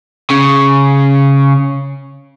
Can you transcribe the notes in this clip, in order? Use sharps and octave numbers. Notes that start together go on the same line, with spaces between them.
C#3